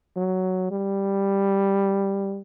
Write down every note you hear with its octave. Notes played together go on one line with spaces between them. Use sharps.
F#3
G3